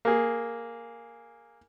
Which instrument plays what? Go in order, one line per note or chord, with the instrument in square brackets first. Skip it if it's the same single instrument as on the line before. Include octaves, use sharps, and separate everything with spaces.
[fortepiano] A#3 G#4